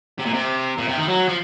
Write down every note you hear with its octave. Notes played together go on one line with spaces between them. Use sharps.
C3
A#2
C3
A#2
C3
D#3
F#3
F3